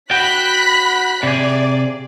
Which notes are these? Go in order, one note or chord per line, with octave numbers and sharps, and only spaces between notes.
F#4 G5 B5 F#6 B6
C3 G#4 D5